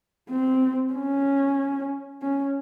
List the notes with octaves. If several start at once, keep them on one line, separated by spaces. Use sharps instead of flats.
C4
C#4
C#4